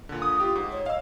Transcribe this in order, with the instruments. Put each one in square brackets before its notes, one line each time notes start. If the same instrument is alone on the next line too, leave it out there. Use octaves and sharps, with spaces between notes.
[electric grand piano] A#2 D3
[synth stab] D#6
[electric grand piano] F4 G4
G#2
[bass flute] C#5
[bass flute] D#5 [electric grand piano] F5 E6